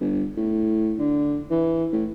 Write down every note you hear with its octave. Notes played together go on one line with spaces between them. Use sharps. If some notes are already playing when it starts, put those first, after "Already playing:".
G1
A2
D3
E3
A2